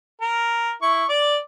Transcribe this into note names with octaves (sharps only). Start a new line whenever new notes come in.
A#4
E4 C#6
D5 D6